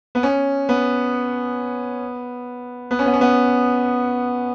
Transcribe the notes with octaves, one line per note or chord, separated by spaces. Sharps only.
B3
C#4
B3
B3
C#4
B3
C#4
B3